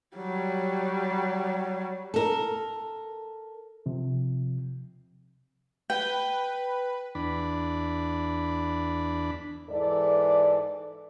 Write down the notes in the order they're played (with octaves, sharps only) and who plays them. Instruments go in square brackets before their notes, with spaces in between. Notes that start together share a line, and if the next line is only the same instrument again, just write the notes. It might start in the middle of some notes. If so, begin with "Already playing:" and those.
[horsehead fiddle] F#3 G3
[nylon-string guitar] A4 A#4
[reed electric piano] C3 F3
[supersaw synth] B4 [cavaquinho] G5
[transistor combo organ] E2 D4 B5
[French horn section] G#2 E3 A4 D5